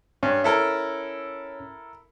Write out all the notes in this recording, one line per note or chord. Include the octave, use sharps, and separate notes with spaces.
G2 C#4
E4 A4 A#4